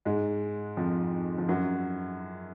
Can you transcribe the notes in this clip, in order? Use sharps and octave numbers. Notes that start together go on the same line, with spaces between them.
G#2 G#3
F2 F3
F3
F#2 F#3